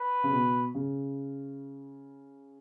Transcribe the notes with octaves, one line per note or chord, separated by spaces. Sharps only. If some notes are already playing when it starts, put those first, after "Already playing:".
Already playing: B4
C#3
B2
C#3